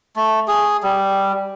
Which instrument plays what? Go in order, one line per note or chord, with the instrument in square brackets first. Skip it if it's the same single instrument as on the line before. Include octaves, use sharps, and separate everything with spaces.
[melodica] A3
G#4
G3